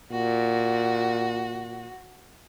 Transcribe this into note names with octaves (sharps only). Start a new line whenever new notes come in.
A#2 F#4